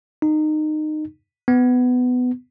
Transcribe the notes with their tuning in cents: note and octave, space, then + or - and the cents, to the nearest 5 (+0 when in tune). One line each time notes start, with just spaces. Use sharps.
D#4 -20
B3 +15